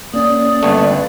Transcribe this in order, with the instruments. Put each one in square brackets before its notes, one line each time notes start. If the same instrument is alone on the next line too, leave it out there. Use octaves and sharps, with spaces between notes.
[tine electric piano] A#3 C#4 [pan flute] D5 [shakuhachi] D#6
[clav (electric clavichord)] G1 A3 [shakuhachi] B4